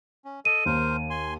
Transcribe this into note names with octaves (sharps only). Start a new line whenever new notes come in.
C#4
A4 D#5 D#7
D#2 A#4 C5
G#5 C6